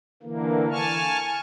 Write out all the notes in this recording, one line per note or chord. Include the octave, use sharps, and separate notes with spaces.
D3 E3 A#3
G#5 A5 C#6 F6